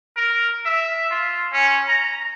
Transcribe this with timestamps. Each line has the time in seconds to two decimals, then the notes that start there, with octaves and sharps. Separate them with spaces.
0.16 A#4
0.66 E5
1.11 F4
1.52 C#4
1.88 A#5